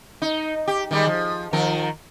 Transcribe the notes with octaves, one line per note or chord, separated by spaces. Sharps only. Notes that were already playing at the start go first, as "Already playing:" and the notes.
D#4
G4
D#3 G3 G#3
F3
D#3 F3 A#4